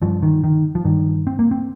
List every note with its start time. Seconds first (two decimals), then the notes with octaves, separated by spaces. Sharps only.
0.02 G2 F3
0.23 D#3
0.44 D#3
0.75 F3
0.85 G2 D#3
1.27 C4
1.39 A#3
1.51 C4